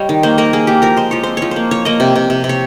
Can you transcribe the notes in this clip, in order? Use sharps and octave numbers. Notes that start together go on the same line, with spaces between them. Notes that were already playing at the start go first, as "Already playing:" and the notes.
Already playing: G3 C#5 D#5
D#3
A#3 C5
A#3 A#4
A#3 G#4
A#3 G4
F3 A#4
G#3 C5
F3 C#5
C4 C5
F3 C#5
A#3 C5
F3 C#5
A#3 D#5
C3
C3
C3
C3
C#5